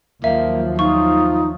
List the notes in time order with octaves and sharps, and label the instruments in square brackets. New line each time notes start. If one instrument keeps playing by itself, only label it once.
[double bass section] D#2 F3 F#3 [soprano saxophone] A#3 [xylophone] E5
[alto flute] D#4 [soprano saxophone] F4 [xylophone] C#6